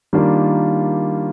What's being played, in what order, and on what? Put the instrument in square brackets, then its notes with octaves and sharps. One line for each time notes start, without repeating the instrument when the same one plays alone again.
[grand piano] D#3 G3 A#3 D4 F4